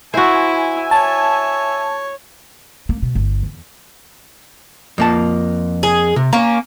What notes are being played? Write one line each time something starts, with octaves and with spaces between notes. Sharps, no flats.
E4 F#4 C5 E5 G#5
C#5 A5
A#3
B2
G1
E2
F2 A#3 A5
G#4
C3
A#3 C#4 A#5